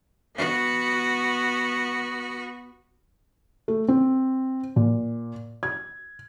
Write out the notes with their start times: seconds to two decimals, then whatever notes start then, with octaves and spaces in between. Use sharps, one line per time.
0.36 B3 F#4
3.68 A3
3.88 C4
4.76 A#2
5.63 G#6